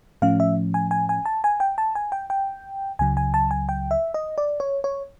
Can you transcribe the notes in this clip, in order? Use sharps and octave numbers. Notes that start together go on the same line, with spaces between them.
A2 F3 A3 C#4 F5
E5
G#5
G#5
G#5
A5
G#5
G5
A5
G#5
G5
G5
C#2 C#3 F#3 G#5
G#5
A5
G#5
G5
E5
D#5
D5
C#5
C#5